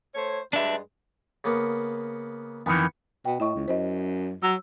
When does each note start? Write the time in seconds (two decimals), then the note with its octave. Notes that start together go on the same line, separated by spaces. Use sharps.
0.15 A3 C5 C#5
0.53 G2 G#3 D4 B4 E5
1.44 C#3 A#3 B3
2.66 F2 D#3 E3 B3 C#6
3.25 B2 G5
3.40 A2 E4 D#5 C#6
3.55 C#2
3.68 F#2 C5 D#5
4.43 F#3 E6